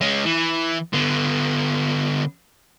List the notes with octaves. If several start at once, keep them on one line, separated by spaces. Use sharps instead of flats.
G#3 C#4
E3
D3 B3